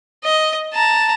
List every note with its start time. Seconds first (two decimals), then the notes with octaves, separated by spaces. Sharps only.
0.24 D#5
0.74 A5 A#5